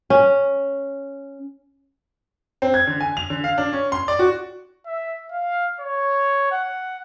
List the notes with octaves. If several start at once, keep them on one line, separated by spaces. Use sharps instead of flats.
C#4
C4
G#6
D3
G#5
F7
D3
F5
D4
C#4
C6
D5
F#4
E5
F5
C#5
F#5